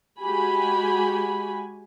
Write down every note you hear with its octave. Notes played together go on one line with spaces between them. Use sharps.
G#3 F#4 G4 G#5 B5